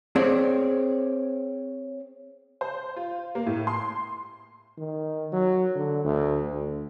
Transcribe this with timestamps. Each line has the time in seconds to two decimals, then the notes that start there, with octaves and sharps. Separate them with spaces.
0.16 C4 G#4 C#5 D5
2.61 C5
2.96 F4
3.35 A#3
3.46 A2
3.67 C6
4.78 D#3
5.33 F#3
5.76 D3
6.05 D2
6.53 D2